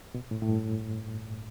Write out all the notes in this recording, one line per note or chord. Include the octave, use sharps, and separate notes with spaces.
B2
A2
A2
G2